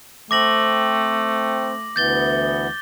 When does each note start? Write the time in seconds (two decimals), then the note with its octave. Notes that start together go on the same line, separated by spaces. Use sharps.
0.31 A3 C4 D6 A#6 F#7
1.96 D2 E3 B3 G6 A6 G7